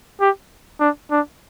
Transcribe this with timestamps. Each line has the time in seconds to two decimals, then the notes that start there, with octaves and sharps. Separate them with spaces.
0.21 G4
0.80 D4
1.11 D4